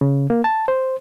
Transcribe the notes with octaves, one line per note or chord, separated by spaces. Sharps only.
C#3
A#3
A5
C5